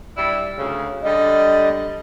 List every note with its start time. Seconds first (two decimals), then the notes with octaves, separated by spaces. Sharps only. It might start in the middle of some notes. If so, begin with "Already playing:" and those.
0.16 G3 D4 E4
0.57 D2 C#3
1.04 D3 G3 D#5